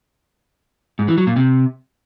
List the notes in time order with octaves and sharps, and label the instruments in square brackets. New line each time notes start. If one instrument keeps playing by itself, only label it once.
[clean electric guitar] G#2
E3
F#3
A#2
C3